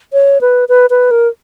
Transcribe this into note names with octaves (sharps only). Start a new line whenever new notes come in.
C#5
B4
B4
B4
A#4